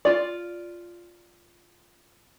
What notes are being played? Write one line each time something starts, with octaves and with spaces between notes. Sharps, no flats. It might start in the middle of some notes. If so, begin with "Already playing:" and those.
F4 D5